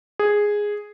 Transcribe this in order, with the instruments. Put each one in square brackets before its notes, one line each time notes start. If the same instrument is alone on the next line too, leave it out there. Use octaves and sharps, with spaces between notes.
[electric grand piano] G#4